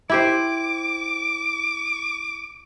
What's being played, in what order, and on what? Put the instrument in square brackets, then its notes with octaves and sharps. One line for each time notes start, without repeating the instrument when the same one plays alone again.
[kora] E4 G4 C5 [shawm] D6